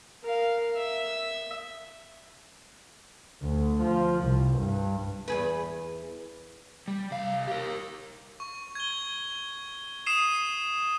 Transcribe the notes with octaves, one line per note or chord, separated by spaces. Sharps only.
A#4 F5
E5
D2
F3
C2
G2
E2 G#4 B4
G3
C2 F5
G4 A#4
C#6
G#6 G7
D#6 C7 D#7 E7